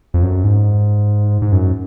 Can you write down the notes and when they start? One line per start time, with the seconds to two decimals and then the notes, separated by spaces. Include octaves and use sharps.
0.14 F2
0.23 F#2
0.44 G#2
1.42 G#2
1.52 F#2